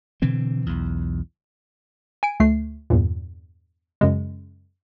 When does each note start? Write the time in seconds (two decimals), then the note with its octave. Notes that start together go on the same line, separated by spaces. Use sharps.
0.22 B2 D3 E3 C4
0.66 B1 E2
2.23 G#5 D7
2.40 D2 A3 C7
2.90 E2 G2 A#2
4.01 F#2 C#3 G#3